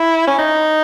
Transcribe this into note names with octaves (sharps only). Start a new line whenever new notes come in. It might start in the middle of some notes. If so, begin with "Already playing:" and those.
Already playing: E4
C#4
D#4